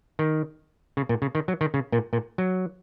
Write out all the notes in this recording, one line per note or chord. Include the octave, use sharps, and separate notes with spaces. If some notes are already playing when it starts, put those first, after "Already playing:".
D#3
C#3
A#2
C#3
D#3
F#3
D#3
C#3
A#2
A#2
F#3